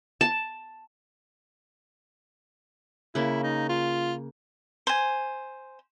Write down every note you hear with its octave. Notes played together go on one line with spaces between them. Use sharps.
A5
C#3 A#3 E4
D#4
F4
C5 G#5